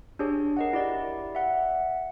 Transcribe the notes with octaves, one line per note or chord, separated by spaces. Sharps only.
D4 G4 G#4 C#5
A#4 D#5 F#5
E4 G4 D5
E5 F#5